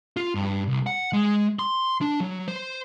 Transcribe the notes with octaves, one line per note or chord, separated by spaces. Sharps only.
F4
G2
C2
F#5
G#3
C6
D4
F#3
C5